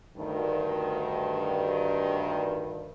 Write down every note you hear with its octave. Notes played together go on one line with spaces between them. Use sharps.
D2 G2 D#3